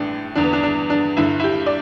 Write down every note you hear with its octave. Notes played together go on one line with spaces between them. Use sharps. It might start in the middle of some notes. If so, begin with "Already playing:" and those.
Already playing: A1 A2 E3 D4
E2 D3 D4
B3
D4
D4
D4
G1 G2 D3 E4
E4
G4
D5